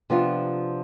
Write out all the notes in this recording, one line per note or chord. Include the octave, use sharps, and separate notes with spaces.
C3 F3 B3 D4 F4